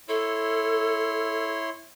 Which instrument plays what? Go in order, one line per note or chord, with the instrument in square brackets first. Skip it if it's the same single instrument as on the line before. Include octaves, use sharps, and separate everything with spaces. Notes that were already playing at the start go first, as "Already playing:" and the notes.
[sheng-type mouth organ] E4 C#5 C6 [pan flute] A4